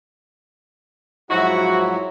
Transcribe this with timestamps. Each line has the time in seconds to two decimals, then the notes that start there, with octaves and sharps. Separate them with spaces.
1.31 G#2 F3 F#3 E4 F#4